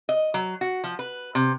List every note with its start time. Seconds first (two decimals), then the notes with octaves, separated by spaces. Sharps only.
0.09 D#5
0.34 F#3
0.61 F#4
0.84 F3
0.99 B4
1.35 C3